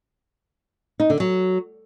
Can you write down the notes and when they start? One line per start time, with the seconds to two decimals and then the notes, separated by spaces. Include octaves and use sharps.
1.00 D#4
1.10 D3
1.20 F#3